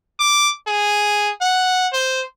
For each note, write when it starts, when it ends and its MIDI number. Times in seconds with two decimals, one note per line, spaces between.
0.19 0.51 86
0.67 1.30 68
1.41 1.88 78
1.93 2.22 72